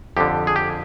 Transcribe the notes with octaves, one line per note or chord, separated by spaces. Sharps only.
F2 D3 G4
G#4
G4